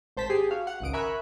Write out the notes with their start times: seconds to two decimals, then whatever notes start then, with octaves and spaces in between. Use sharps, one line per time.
0.17 G#1 C5 A5 B6
0.30 G4 G#4 C7
0.51 F#4 F5
0.67 F#5
0.80 G#1 C#2 D#6 D7
0.93 A#4 E5 G#5 B5 C#6 F#6